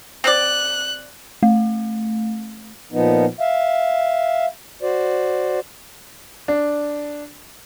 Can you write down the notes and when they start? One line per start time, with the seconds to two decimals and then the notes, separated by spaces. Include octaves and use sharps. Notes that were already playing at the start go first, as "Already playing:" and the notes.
0.24 C4 D5 F#6
1.43 A3
2.93 A#2 F3 B3 D#4
3.40 E5 F5
4.82 F#4 C5 D5
6.48 D4